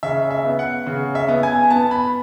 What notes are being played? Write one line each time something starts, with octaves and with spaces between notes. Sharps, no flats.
C#3 E5
E5
B3
F#5
C#3
E5
B3
G#5
B3 A5
B5